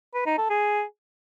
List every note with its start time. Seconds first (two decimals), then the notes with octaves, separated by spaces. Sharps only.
0.14 B4
0.26 D#4
0.38 A4
0.50 G#4